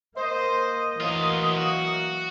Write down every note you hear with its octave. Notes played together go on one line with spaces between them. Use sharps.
A#3 C5 D#5
D2 E3 F#3 A#3 F4
F#4